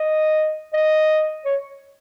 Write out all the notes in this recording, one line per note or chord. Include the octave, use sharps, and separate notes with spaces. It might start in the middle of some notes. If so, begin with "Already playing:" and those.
Already playing: D#5
D#5
C#5